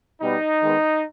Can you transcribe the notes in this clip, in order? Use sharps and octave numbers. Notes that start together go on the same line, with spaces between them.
B2 G3 B3 D#4
D#3 G#3 B3